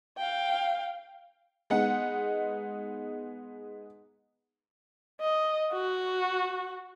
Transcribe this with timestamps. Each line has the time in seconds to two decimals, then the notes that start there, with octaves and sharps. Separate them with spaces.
0.18 F5 G5
1.70 G#3 B3 D#4 F#5
5.20 D#5
5.73 F#4